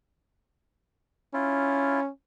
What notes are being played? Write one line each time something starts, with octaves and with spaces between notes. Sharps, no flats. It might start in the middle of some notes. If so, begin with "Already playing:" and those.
C#4 E4 F4